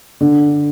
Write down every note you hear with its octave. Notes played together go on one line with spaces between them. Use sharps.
D3